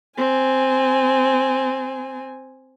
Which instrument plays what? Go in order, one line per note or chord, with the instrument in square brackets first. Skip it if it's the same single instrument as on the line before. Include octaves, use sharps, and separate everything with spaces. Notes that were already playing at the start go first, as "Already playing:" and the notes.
[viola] C4 G#5